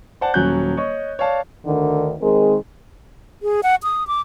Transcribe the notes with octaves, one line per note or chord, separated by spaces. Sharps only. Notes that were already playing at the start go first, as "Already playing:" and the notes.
C5 D5 F#5 A5
D#1 F#3 C#4 F#6 G6
C#5 D#5 C#6
C#5 D5 F5 A5
D2 D3 D#3
D#3 G#3 C4 G#4 A#4
G#4
F#5
D#6
D6